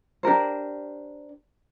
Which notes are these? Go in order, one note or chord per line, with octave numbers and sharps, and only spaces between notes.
D4 G4 A#4 C5